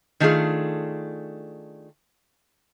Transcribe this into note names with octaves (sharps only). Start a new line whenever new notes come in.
D#3 A3 D4 F4 G#4